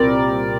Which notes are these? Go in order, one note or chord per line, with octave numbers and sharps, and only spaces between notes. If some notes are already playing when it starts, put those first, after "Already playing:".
Already playing: C2 A#2 G3 C4 A#4 D5